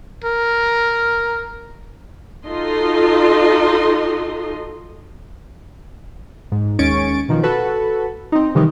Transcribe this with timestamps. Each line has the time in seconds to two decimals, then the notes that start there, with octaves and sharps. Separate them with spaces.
0.24 A#4
2.45 D#4 F4 F#4 A4 D#5 C6
6.52 G#2
6.79 D#2 G#3 C#4 C#6 A6 D7
7.29 B2 D#3 F3
7.43 F#4 A4 B4
8.32 C4 D#4
8.55 C3 D#3 E3 G3 D#4